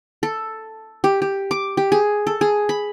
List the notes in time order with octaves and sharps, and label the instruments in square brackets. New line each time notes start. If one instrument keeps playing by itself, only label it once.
[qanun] A4
G4
G4
D6
G4
G#4
A4
G#4
B5